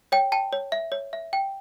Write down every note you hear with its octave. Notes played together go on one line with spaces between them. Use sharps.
C#5 G5
G5 A5
C#5
E5
C#5
E5
G5